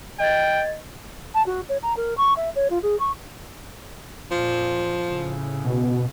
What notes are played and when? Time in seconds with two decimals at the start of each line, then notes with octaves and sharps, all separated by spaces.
0.20 D#5 G5 G#6 A6
1.34 A5
1.46 F#4
1.69 C#5
1.82 A#5
1.96 A#4
2.17 C#6
2.36 E5
2.55 C#5
2.70 F4
2.82 G#4
2.99 C#6
4.31 F2 A#2 F3
5.09 A2 C#3
5.64 B2